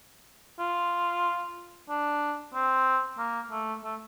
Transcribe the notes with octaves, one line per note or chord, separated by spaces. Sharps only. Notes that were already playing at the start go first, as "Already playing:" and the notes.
F4
D4
C4
A#3
A3
A3